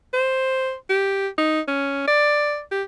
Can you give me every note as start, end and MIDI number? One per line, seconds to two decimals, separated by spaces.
0.14 0.74 72
0.90 1.28 67
1.38 1.60 63
1.68 2.06 61
2.08 2.61 74
2.71 2.83 67